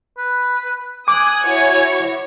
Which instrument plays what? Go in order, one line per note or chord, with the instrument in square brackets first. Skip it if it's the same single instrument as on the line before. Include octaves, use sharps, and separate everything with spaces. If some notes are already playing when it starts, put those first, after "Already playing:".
[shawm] B4
[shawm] G#5 [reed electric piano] D6 [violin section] D#6 F#6
[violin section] E4 F#4 C#5